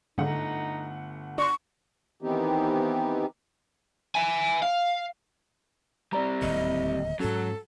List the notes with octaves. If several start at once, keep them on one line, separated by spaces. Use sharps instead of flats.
G1 G#2 D3 A3 D#4 F#5
D4 F#4 C6 C#6
D#3 E3 B3 C4 D#4 G4
E5 G#5
F5
G3 C4 D5 A#5
D1 D#2 D3 D#5
G#2 F#3 C#4 A4